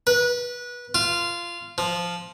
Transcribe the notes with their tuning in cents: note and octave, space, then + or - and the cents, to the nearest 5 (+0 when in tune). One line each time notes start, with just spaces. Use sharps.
B4 -25
F4 -15
F3 +0